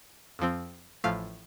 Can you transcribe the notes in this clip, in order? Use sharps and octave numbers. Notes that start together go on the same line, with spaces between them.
F2 F3 C4
A1 A2 F3 A3 F5